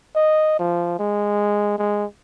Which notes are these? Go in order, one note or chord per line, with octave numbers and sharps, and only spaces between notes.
D#5
F3
G#3
G#3